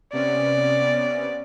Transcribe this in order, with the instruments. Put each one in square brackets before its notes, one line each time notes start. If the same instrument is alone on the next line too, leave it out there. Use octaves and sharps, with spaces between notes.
[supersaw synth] C3 B3 C#4 [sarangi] D5